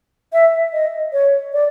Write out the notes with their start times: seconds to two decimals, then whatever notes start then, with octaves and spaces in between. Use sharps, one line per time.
0.33 E5
0.73 D#5
1.13 C#5
1.53 D5